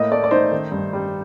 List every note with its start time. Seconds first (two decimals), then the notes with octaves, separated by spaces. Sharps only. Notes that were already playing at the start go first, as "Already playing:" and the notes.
Already playing: A2 A#3 D#5
0.11 A3 D5
0.24 D5
0.31 D#4 C5
0.51 D#3
0.72 G2
0.93 G3